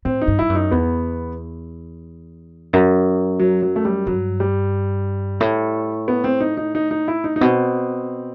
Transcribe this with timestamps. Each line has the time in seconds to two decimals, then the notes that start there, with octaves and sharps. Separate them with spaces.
0.05 A2 C4
0.22 D#4
0.28 G2
0.39 G2 E4
0.49 F#2
0.55 D#4
0.71 E2 B3
2.73 F#2
3.40 F#3
3.63 F#3
3.76 A3
3.85 G3
4.07 G2 F#3
4.40 G3
5.40 A2
6.08 B3
6.24 C4
6.41 D#4
6.57 D#4
6.75 D#4
6.91 D#4
7.08 E4
7.24 D#4
7.36 D#4
7.41 B2 C4